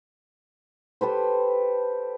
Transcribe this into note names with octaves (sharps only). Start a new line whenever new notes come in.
G4 A4 B4 C5